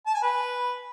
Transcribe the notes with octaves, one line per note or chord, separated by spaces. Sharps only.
A5
G#5
B4